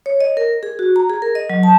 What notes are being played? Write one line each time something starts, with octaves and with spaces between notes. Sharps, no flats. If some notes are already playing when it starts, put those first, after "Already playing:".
C#5
D#5
A#4
G#4
F#4
A#5
G#4
A#4
D#5
F#3
A5